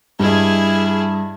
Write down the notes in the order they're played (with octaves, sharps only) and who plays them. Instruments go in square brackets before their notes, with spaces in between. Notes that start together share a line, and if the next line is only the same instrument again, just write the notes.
[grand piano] G2 D#5 [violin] E4 G#4